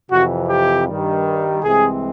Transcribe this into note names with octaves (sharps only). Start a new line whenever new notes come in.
F2 C3 E3 F#4
G4
G2 D#3 G3
C2 C3 E3 G#3 C4 G#4